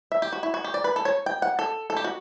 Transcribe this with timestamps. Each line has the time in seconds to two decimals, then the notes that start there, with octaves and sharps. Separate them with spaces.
0.12 E5
0.22 G4
0.33 F#4
0.43 E4
0.54 F#4
0.64 G4
0.74 D5
0.84 B4
0.96 A4
1.05 C#5
1.26 G5
1.42 F#5
1.59 A4
1.90 A4
1.97 G4
2.04 F#4